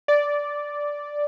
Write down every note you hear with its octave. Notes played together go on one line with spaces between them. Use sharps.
D5